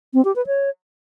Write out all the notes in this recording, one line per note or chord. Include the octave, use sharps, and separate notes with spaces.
C4
G4
B4
C#5